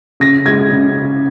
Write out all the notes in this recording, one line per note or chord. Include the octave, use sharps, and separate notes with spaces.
C#3 A#6
G#3 G#6
C#3